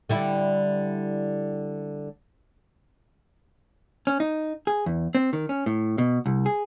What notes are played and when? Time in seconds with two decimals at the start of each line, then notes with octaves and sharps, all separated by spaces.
0.09 D3 G3 E4
4.07 C#4
4.20 D#4
4.67 G#4
4.86 E2
5.15 C4
5.33 D#3
5.49 C#4
5.66 A2
5.98 B2
6.26 C2
6.46 G#4